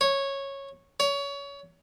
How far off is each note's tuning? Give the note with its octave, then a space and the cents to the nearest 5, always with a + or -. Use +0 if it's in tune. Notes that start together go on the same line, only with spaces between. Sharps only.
C#5 -10
C#5 +25